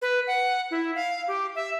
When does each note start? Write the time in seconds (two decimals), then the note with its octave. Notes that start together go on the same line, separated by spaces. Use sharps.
0.02 B4
0.27 F#5
0.71 E4
0.95 F5
1.28 G4
1.55 E5